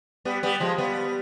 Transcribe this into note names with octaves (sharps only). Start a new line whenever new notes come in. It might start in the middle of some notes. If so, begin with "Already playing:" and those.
G3 B3
G3 B3
F3 G#3
G3 B3